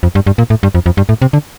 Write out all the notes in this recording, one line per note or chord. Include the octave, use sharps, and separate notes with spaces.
F2
G2
G2
A#2
A2
G2
F2
F2
G2
A2
C3
D3